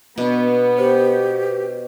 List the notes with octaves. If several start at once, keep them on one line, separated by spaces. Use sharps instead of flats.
B2 B3 D4
G4 C5